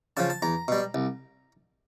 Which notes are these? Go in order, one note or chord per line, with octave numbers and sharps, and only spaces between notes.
C#3 F3 A5
A5
E2 A#5
B2 G3
C2